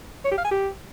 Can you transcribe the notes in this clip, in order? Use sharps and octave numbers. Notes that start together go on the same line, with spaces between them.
C#5
G4
F5
G#5
G4